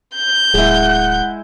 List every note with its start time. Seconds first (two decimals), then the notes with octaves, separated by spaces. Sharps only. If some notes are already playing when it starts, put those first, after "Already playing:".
0.15 G6
0.54 D1 G#3 E4 F#5